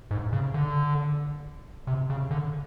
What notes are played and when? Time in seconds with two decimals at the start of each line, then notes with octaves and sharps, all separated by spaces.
0.11 G#2
0.33 C#3
0.54 D3
1.87 C3
2.10 C#3
2.31 D3